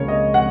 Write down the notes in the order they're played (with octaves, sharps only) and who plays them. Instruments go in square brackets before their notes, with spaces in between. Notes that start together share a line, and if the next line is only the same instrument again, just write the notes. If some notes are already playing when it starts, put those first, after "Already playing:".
Already playing: [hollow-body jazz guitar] C#2 C#3 A#3 [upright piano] C#5
[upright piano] D#5
F#5